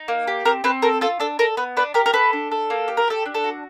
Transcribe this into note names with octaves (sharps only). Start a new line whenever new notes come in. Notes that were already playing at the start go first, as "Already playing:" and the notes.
Already playing: D#4
A#3
G4
C4 A#4
C4 B4
A4 A#4
F4 A4
D4 A4
A4 A#4
B3 B4
D4 B4
G4 A#4
A#4
A4 B4
D4
A4
A#3
G4
A#4
G4 A4
D4
A4
F#4